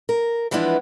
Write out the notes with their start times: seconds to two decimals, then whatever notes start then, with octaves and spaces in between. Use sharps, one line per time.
0.09 A#4
0.51 E3 F3 G#3 B3 D4 E4